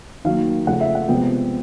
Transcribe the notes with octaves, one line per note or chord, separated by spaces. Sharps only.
D#3 F#3 A#3 F5
C#3 F3 A3 F#5
E5
F#5
C3 F3 G#3 B3 G5